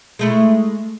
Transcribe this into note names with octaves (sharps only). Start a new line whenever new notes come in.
G#3 A3 E4